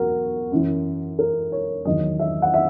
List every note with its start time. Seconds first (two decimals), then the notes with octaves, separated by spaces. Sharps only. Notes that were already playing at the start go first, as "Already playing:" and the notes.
Already playing: E2 B2 F#3 F#4 A#4
0.52 F#2 E3
1.19 A#4
1.52 C#5
1.85 E2 D#3 F#3 D#5
2.19 E5
2.42 F#5
2.54 E5